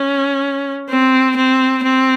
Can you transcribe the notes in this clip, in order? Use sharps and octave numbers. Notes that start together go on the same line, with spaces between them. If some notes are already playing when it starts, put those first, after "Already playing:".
Already playing: C#4
C4
C4
C4